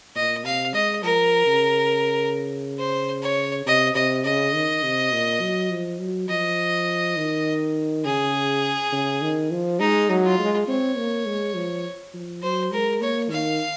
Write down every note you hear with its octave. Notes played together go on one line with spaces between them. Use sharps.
A#2 D#5
C3 F5
G#3 D#5
F3 A#4
C#3
C5
C#5
C3 D#5
C3 D#5
C#3 D#5
D#3
C3
A#2
F#3
F3
F#3
F3 D#5
D#3
C#3 G#4
C#3
D#3
F3
G#3 D#4
F#3
F4
G#3
C4 C#5
A#3
G#3
F3
F3
F#3 C5
G#3 A#4
A#3 C#5
D#3 F5